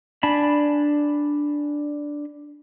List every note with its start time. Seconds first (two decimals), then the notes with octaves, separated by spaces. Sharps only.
0.23 D4 G#5 A5 B5